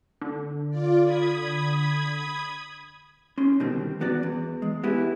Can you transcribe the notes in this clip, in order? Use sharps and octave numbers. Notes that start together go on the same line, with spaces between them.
D3
F4 D5
B5 D#6 G#6
C#4 C6
B2 D3 D#3 G3 C4
E2 B3 F#4 D5
E2
G#3
B3 E4 G4 G#4